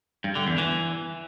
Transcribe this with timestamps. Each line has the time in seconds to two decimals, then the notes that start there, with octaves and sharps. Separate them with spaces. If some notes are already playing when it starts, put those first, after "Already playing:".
0.24 G2
0.35 D3
0.47 E2
0.58 E3